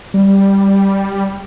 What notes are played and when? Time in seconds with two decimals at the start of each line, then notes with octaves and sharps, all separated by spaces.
0.14 G3